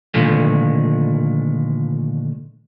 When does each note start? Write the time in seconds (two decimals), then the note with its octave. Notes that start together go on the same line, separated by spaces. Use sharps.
0.14 A#2 D3 D#3 F3 G#3 A3